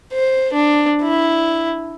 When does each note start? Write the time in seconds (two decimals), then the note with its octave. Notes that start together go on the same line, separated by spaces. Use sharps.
0.13 C5
0.53 D4
1.02 E4